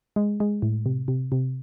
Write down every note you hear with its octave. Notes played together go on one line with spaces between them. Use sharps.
G#3
G#3
A2
C3
C3
C3